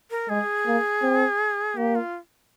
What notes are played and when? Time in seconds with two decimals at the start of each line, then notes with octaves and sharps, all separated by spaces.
0.11 A#4
0.29 G#3 G#4
0.66 A#3
1.03 C4
1.76 A#3 G4
1.95 F4